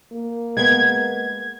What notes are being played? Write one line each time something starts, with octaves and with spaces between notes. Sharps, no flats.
A#3
G#3 B3 G#6